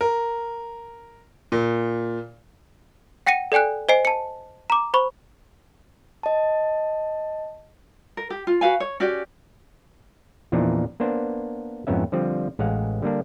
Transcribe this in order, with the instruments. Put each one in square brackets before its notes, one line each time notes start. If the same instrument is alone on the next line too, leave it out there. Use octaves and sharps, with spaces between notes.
[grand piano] A#4
A#2
[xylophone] F#5 G5 A#6 C#7 D#7
A4 D5 G5 G#5 F#6
C5 D#5 G#5 C7
A5 C#7
A#5 D6
C5 B5 C#6
[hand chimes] D#5 A5
[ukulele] A#4
G4
F4
F#4 B4 F5 G#5
C#5
C#4 F#4 G4 D5
[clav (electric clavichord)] E2 A#2 E3 F3 D4 D#4
A#3 B3 D4 C5
F2 G#2 B3 C#4 E5
D3 F3 G3 C4
A1 G#3 F5 F#5
D3 G3 A#3 D4